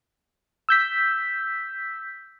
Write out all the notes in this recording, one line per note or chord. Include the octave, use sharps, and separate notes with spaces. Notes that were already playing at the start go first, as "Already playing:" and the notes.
E6 G6 B6